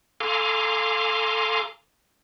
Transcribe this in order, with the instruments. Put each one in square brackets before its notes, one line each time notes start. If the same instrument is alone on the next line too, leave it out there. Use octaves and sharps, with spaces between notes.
[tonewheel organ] A4 F5 G#5 A#5 C6 D6